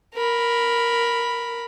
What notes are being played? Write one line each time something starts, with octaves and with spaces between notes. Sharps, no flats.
A#4 B5